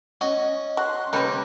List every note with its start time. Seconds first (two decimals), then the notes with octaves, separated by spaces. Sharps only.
0.21 C#4 F#4 D#5
0.77 F#4 C6 F#6
1.13 C3 G3 A#3 C#4 A#4 B4 D#5 G5